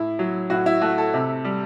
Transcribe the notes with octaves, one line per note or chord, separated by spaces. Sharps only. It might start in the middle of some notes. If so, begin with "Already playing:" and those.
Already playing: A2 E4
F#3
A2 F#4
E4
A3 F#4
A4
C3
G3